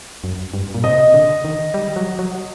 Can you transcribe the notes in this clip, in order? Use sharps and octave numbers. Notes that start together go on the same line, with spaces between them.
F#2
G2
A#2
C3 D#5
D3
D#3
G3
F#3
F#3